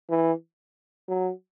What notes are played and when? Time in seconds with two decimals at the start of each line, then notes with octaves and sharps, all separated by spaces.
0.10 E3
1.08 F#3